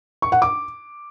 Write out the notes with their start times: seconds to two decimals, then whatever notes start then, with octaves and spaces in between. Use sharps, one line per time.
0.22 C#6
0.32 F#5
0.42 D6